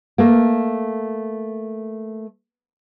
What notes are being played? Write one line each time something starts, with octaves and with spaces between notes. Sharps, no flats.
A3 A#3